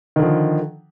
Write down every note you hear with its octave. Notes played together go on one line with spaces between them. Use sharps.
D3 D#3 F3